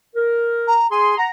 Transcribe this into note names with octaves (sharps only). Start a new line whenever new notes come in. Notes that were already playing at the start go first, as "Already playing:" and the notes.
A#4
A#5
G#4 G#5 C6
F#5 A#5